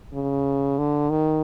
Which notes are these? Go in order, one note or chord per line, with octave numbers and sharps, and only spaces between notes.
C#3
D3
D#3